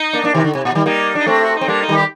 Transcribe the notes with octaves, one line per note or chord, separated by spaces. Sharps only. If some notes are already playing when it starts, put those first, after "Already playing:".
Already playing: D#4
A#3 D4
A#3 D4
C3 D#3
D3
C3
A#2
D#3 G3
G3 A#3 D#4
D4 D#4
A3 C4 D4
F#4
D#4
C4
G3 A#3 D4
D#4
D#3 G3
G4